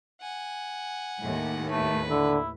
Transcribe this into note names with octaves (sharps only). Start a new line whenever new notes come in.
F#5 G#5
D#2 A2
A3 B4
D3 E4